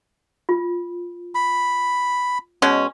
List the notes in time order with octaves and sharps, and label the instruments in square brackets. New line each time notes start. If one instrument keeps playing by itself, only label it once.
[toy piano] F4
[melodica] B5
[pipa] B2 G#3 C#4